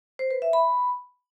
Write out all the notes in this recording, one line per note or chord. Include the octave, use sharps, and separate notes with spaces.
C5
B4
E5
B5